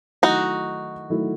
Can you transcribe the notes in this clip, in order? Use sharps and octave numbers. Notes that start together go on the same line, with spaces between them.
D#3 F#3 A3 D#4 E4 F#4
D#3 F#3 A3 E4